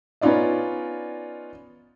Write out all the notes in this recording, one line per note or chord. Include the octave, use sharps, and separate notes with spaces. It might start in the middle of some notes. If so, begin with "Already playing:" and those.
B3 C#4 D#4 F4 D5 D#5